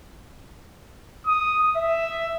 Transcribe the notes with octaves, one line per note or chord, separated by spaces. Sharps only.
D#6
E5